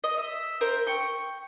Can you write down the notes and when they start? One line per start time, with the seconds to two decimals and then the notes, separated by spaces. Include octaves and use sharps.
0.04 D#5
0.18 E5
0.61 A#4 C5
0.87 G5 C#6